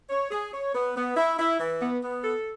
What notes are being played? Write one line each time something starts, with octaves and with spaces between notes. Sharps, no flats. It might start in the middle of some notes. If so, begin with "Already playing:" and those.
C#5
G#4
C#5
B3
B3
E4
E4
E3
B3
B3
A4